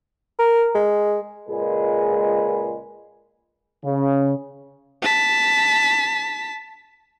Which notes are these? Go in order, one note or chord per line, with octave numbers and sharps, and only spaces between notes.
A#4
G#3
C#2 A#2 G#3 G#4 B4
C#3
A5 B6